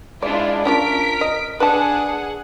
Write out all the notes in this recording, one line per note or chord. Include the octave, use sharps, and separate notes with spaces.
G#3 D4 E4 F4 D5
C#4 D4 F4 A#4 B6 D7
D#5
D4 G#4 B4 F#5 A5